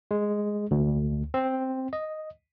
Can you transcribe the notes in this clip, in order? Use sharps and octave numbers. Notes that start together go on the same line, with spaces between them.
G#3
D2
C4
D#5